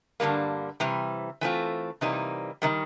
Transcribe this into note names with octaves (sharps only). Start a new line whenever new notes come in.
G2 D3 G3 A#3
C3 E3 G3
E3 A3 C4 F4
C3 E3 G3 A#3 D#4
C3 D#3 G3